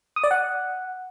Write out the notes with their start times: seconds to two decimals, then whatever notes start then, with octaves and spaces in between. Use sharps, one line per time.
0.16 D#6
0.24 D5
0.31 F#5